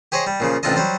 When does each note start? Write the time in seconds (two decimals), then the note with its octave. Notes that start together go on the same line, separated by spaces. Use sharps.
0.12 G4 G#4 C5 C#5 D#5
0.27 G3
0.40 A#2 C#3 F3
0.63 A1 C3 D4 F4 A4 D#5
0.77 F#3 G3 C5